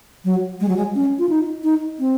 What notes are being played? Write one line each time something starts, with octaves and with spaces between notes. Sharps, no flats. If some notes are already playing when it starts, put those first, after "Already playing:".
F#3
G#3
F#3
G#3
C#4
F4
D#4
D#4
C4